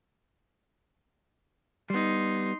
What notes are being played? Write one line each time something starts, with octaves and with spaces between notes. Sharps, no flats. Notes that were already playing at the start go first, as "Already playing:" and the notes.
G3 B3 D#4 C6